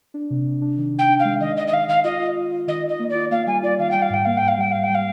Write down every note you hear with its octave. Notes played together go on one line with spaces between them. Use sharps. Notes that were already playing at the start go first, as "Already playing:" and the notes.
D4
C3
C3
D4
D#3
D#3 G5
D4
F5
G#3
D#3 D#5
D#3 D#5
D#5
D#3 F5
D#3 F5
F4 D#5
F4
F4
F4
D#3 D#5
D#3
D#5
A#3
D5
F4
A#3 F5
G3 G#5
F4 D5
D#3 F5
G3 G5
F5
G#2 G5
A#3 F5
G#2 G5
F5
G3 G5
G#2 F5
G5
G3
F5